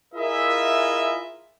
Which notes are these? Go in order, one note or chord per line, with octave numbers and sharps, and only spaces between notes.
E4 F4 G#4 A#4 D#5 E5